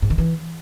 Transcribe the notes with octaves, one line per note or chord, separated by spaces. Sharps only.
G#2
D#3
E3